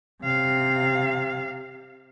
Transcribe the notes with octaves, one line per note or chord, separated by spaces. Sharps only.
C3 F5